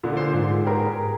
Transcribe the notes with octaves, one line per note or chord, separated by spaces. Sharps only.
A#2 D3
C5
G#2
G4 G#4 A#4